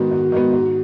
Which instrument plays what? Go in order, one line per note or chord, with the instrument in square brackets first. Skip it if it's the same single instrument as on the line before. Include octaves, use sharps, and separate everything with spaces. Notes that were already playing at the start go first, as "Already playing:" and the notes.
Already playing: [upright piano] G#2 D#3 G#3 B3 [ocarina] F#4
[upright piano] G#2
D#3 G#3 B3
G#2